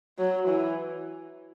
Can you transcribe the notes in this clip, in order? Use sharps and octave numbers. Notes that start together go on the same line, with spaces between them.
F#3
E3